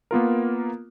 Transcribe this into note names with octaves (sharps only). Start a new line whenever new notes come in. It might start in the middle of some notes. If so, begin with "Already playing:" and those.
A#3 B3 F4 A#4